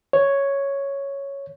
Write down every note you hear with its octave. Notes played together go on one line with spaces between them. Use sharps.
C#5